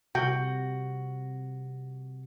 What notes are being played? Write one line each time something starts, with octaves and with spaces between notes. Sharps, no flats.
C3 F#4 G5